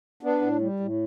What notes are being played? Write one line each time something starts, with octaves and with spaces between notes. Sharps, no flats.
B3 D4
A2
G3
A2